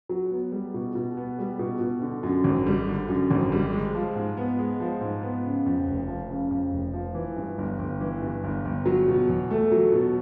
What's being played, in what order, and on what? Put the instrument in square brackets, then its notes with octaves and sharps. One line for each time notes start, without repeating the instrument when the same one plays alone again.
[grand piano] F#3
B3
G3
B2
B2
B3
G3
B2
B2
D3
F#2
G#1
G3
D3
F#2
G#1
G3
G#3
F3
G#2
B3
G#3
F3
G#2
B3
C#3
F2
F1
F3
C#3
F2
F1
F3
E3
G2
G1
G1
E3
G2
G1
G1
F#3
B2
E2
A3
F#3
B2